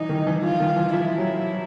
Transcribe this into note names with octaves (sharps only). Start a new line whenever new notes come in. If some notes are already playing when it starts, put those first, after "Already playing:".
Already playing: E3 D#4
D#3
E3
F3 F4
D#3
E3
F3 E4
F#3